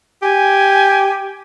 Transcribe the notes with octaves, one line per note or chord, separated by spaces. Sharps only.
G4 G#5